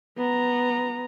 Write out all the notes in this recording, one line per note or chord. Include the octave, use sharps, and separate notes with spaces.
B3 A#5